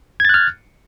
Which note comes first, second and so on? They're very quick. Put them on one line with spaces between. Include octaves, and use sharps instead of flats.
G#6 A6 F#6 F6